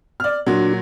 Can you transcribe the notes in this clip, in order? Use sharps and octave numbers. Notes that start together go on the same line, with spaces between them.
D5 F6
A#2 F#3 D4 F#4